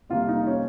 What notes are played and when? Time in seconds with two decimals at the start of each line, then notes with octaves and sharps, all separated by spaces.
0.10 F2 C3 G3 A#3 F4
0.29 D#4
0.47 C#4